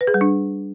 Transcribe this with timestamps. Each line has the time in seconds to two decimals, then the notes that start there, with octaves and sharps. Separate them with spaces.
0.01 B4
0.07 G#4
0.14 G3
0.21 D4